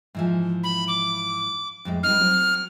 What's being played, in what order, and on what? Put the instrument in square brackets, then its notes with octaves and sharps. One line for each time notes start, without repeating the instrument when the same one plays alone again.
[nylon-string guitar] G#2 E3 F3
[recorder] B5
D6
[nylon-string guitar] F2 A2 G#3
[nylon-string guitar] G3 C4 D#4 [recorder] F6
[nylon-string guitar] F#3 C4